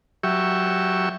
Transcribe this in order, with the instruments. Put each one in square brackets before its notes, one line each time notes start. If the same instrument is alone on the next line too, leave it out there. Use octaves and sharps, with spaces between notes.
[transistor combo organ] F#3 G4 E5 C#6